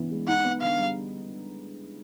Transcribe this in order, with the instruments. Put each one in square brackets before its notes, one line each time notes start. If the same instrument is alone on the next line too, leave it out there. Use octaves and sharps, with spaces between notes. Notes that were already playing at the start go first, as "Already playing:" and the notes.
Already playing: [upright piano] C#3 E3 B3 D4
G#3
[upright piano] D#4 [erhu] F#5
[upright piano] B3
[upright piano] D3 [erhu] F5
[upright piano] G3